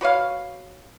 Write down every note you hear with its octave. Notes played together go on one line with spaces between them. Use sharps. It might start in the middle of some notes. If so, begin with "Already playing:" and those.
F#4 B4 C#5 F5